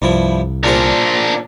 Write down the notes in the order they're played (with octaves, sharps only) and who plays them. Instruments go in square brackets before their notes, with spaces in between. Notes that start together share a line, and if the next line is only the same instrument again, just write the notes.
[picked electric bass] C2 [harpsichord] G2 F3 E4
[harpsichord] A#2 G#4 C5 [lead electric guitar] D4 A#4